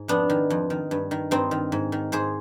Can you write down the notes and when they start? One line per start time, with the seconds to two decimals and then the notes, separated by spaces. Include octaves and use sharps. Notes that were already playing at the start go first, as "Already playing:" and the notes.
Already playing: G#2
0.08 F2 B3 D4
0.30 D#3
0.50 F2
0.70 D#3
0.91 G2
1.11 D#3
1.31 G2 C4 D#4
1.51 D#3
1.72 G#2
1.92 D#3
2.12 G#2 G#4 C5